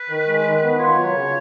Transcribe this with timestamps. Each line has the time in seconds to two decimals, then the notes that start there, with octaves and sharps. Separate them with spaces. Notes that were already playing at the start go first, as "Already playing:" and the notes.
Already playing: B4
0.09 D#3
0.27 G#3
0.45 D#3
0.62 B3
0.79 F4 C#5
0.97 F#3
1.13 C#3